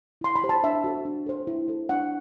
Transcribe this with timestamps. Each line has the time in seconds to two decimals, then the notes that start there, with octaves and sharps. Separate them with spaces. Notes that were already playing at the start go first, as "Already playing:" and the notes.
0.21 E4 C6
0.36 B5
0.43 G4 C5
0.49 A5
0.63 D4 E5
0.84 F#4 A4 C5
1.05 D4
1.26 A4 C5
1.47 E4
1.68 A4 C5
1.89 D4 F#5